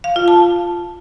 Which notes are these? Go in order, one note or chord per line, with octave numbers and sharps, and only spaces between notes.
F5
F4
A5